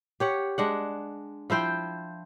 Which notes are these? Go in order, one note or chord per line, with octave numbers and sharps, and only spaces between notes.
G4 C#5 F#5
G#3 D4 F#5
F3 E4 C5 G5